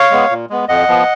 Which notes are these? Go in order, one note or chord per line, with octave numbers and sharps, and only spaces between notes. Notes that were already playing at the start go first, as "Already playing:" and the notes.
Already playing: C#5 F5
G#3 B3
A#2
G#3 B3
F2 D#5 F#5
F3 B3